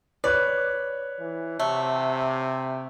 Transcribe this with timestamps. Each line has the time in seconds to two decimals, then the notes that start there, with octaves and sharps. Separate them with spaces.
0.24 B4 C#5 D5 F#6
1.20 E3
1.60 C3 F#3 A3